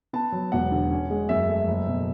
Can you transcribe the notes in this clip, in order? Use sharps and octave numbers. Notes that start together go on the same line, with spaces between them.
B3 A5
F#3
E1 F#5
D3
C#4
G#3
F#2 E5
A3
F#1
B2